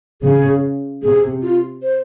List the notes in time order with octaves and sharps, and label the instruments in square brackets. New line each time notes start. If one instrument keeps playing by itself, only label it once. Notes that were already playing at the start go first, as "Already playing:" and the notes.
[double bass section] C#3 [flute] G#4
[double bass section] C3 [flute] G#4
[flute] F4
C5